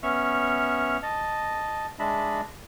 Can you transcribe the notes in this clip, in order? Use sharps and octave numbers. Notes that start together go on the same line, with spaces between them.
B3 C#4 E5 C#6 F6
D#5 A5
G#3 D4 D#5 E5 A5 B5